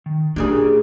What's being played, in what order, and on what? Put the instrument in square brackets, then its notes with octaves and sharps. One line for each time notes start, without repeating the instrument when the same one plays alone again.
[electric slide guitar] D#3
[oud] A#2 C#3 G#4 [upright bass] A3 [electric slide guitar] D4 G4 D5